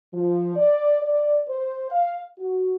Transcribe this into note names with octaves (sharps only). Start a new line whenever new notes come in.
F3
D5
D5
C5
F5
F#4